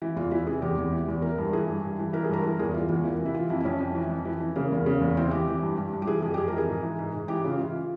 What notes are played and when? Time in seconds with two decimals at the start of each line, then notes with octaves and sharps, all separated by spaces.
0.02 E3
0.16 E2 F4
0.31 E3 E4
0.47 C3 G#4
0.62 E2 G4
0.77 E2
0.92 E3
1.08 E2
1.22 E3 A#4
1.38 G2
1.53 E3 G#4
1.68 G2
1.83 G2
1.99 E3
2.13 E3 A#4
2.24 G#4
2.29 G2 A#4
2.43 E3 A#4
2.59 E2 G#4
2.74 E3 F4
2.89 E2 F4
3.04 E3 A#3
3.19 C3
3.25 E4
3.34 E3 F4
3.50 F2 E4
3.60 E4
3.65 F2 C#4
3.80 F2
3.95 E3
4.10 F2
4.25 E3
4.40 E3
4.56 C#3 A#3
4.72 E2
4.86 C#3
5.01 E2
5.17 E3 C4
5.31 E3 G4
5.48 E3
5.62 G2
5.77 G2
5.93 G2
6.02 G4
6.07 E3 G#4
6.22 F2 G#4
6.34 G4
6.37 F2 G#4
6.48 A#4
6.54 E3 G#4
6.68 G#2
6.83 E3
6.98 G#2
7.13 G#2
7.28 E3 G4
7.44 C#3 F4
7.59 E3 F4